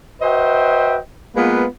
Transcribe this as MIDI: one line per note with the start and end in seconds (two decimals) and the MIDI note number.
0.21 0.97 66
0.21 0.97 71
0.21 0.97 72
0.21 0.97 75
0.21 0.97 76
0.21 0.97 79
1.36 1.64 56
1.36 1.64 58
1.36 1.64 59
1.36 1.64 65
1.36 1.64 71